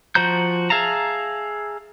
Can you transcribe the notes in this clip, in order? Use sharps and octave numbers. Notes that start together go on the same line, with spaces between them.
F3 F#4 C5 A#5 G6
G#4 E5 F5 A5 A#5